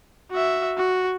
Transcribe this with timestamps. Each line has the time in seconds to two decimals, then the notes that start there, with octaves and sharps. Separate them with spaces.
0.31 F#4 E5
0.78 F#4